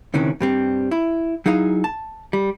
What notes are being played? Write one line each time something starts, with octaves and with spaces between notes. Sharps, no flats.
D2 C3 D#3 E3 C#4
G2 G3 C4
E4
F#3 D#4 E4 G#4 F5
A5
G3